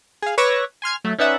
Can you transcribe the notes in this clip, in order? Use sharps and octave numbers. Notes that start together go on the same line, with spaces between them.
G#4 F5
B4 C#5 C#6 D6 E6 A#6
G#5 C6 F6 G#6
F#3 A3
C#4 D#4 B4 D5 E5 F#5